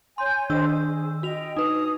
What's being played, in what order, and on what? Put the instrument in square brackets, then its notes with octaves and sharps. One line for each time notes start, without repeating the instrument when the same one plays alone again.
[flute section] C#5 G#5 G6 [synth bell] C6
[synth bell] D#3 D4 E6 [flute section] C5 D#5
[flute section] G#4
[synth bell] F#4 F7 [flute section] D#5 G5
[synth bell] D#4 B4 [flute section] D#6